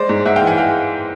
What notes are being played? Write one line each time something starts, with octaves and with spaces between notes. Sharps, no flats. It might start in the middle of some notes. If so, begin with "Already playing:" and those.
Already playing: G#3 C5 D5
G#2
G#2 E5 F#5
F5 G5
E3
F#5 G#5
G#3 F5 G5